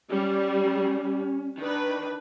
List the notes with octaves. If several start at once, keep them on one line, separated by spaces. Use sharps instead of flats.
G3 C#4
D#3 D4 B4